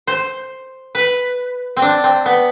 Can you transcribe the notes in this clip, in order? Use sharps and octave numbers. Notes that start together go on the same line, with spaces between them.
C5
B4
C4
D4
C4
B3